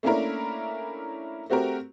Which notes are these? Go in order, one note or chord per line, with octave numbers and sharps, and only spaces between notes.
A3 A#3 C#4 D4 E4 A#4
A3 C4 F#4 G4 A#4